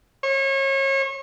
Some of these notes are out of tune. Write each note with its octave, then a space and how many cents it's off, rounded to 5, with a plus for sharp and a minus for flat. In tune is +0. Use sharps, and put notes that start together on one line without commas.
C#5 -35